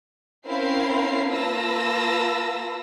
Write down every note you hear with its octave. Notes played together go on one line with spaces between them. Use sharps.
C4 C#4 E4 A#4 F5 C7
A#3 F4 B4 A5 E6 A#6